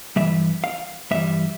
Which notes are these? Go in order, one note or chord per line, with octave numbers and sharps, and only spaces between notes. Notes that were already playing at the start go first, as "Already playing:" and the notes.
G2 E3 G3 E5
F5
G2 E3 G3 E5